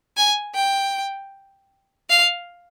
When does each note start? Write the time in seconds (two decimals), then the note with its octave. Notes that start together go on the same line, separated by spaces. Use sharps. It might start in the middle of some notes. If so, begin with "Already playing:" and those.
0.17 G#5
0.55 G5
2.10 F5